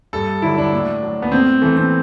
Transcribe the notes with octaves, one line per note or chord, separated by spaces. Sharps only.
G2 A4
D3 F#3 E4
D4
A2
F#3
B3
A2 C4
E3 A3
C4